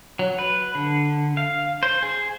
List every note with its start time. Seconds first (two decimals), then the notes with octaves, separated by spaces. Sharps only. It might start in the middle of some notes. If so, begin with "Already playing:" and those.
0.19 F#3
0.39 B4
0.75 D3
1.37 F5
1.83 C5
2.03 G#4